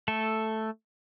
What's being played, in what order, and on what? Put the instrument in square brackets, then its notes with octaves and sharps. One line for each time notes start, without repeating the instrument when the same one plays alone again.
[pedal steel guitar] A3 A4